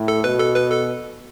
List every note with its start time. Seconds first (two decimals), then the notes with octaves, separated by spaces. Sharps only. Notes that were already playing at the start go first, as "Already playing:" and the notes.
Already playing: A2
0.08 A4
0.24 B2 B4
0.40 A4
0.56 B4
0.72 A4